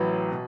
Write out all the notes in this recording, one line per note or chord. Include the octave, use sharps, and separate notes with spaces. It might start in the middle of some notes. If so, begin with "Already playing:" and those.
Already playing: A1 A2 F#3 B4
B2